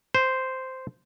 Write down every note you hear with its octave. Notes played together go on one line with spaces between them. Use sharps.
C5